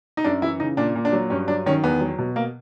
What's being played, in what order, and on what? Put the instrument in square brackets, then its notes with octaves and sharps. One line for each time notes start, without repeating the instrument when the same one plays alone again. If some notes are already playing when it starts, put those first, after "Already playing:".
[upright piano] D#4
F#2 D4
E3 E4
C#3 D#4
A#2 D4
A#2
D4
F#3
G2 C#4
F#3 D4
D#3 C#4
E2 B3
F#3
B2
A#3